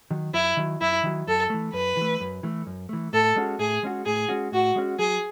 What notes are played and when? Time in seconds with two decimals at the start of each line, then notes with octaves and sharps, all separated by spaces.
0.11 D#3 F#3
0.33 F#2 E4
0.57 D#3 F#3
0.81 F#2 E4
1.03 D#3 F#3
1.27 F#2 A4
1.50 E3 A3
1.73 F#2 B4
1.97 E3 A3
2.21 F#2
2.43 E3 A3
2.67 F#2
2.89 E3 A3
3.13 A2 A4
3.36 G#3 C#4 F#4
3.59 A2 G#4
3.83 G#3 C#4 F#4
4.05 A2 G#4
4.29 G#3 C#4 F#4
4.52 A2 F#4
4.76 G#3 C#4 F#4
4.99 F#3 G#4